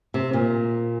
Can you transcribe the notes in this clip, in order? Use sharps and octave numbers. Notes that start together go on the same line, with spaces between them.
C3
A#2